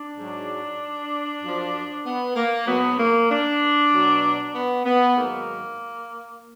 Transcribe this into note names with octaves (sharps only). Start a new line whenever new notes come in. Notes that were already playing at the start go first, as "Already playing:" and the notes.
Already playing: D4
G#2 F#3
F#2 F3
B3
A#3
G#2 F#3 B3
A#3
D4
B2 F#3
B3
B3
G#2 D#3 F#3 A#3